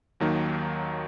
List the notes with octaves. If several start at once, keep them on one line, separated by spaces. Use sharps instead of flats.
D#2 D#3 F#3 A#3 D#4